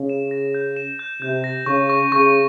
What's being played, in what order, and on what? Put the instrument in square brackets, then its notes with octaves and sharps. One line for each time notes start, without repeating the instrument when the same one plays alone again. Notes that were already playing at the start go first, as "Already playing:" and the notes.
Already playing: [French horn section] C#3
[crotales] E7
A#6
G6
E7
G6
[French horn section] C3 [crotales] G6
[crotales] A#6
[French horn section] C#3 [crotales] C#6
[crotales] C#6
[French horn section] C#3 [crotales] C#6